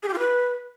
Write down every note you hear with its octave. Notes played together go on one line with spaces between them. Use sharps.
G#4
G4
F4
B4